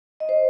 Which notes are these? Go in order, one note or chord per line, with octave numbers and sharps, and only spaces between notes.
D#5
C5